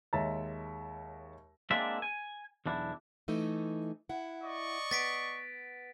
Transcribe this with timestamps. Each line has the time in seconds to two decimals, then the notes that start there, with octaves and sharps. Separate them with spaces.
0.13 D#2 G#3 C#5 E5 A#5 A6
1.71 G#3 A#3 C4 D4 D5 E5
2.02 G#5
2.66 B1 E2 D4 E4
3.28 E3 A3 D#4
4.09 E4 F#5
4.42 D5 D#5 C#6
4.91 B3 A6 B6 D7